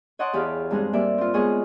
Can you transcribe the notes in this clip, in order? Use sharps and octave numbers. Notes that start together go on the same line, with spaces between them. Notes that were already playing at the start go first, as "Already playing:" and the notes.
C#5 D#5 F#5 A5 C6 D6
E2 G4 G#4 F5
G2 G#3 C4 D#4 G#4
G3 A#3 D5 E5
C4 F4
G#3 B3 G#4 C#5 D#5 G#5